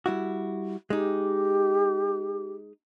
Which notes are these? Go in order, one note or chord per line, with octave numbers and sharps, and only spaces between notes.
G3 E4 F#4
G#3 D#4 G4